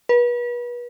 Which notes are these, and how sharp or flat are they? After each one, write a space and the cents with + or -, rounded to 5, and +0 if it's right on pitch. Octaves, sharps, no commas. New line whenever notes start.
B4 -35